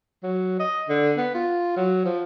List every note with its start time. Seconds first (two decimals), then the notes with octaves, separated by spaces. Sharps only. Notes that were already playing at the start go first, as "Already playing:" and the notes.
0.23 F#3
0.60 D#5
0.89 D3
1.17 B3
1.35 F4
1.77 F#3
2.05 F3